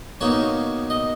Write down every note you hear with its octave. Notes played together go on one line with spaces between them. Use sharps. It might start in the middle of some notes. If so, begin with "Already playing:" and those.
B2 A#3 D#4 C#5
D#5